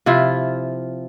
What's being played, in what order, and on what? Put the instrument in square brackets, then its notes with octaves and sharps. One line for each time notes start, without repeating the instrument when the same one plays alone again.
[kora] C3 F3 E4 F4